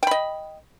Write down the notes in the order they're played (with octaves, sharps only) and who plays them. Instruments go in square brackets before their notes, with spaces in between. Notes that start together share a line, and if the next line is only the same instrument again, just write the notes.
[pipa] G5
B5
D#5